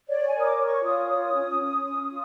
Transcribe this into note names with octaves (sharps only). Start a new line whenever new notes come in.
C#5 D5
G#5
A#4
D#6
D6
C#5
C#6
F4 D#6
C#5
C#4
C#4
C#4
F4